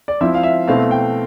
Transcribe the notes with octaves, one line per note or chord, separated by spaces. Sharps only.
D5
F3 C4 E4 E5
F5
E5
B2 A3 C4 E4 F5
G5